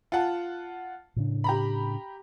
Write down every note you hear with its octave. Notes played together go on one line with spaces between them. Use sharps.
F4 F#5 A5
A2 C#3 D4
G4 A#5 B5